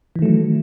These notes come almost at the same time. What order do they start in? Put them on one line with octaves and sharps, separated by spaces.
E3 D#3 A3 F#3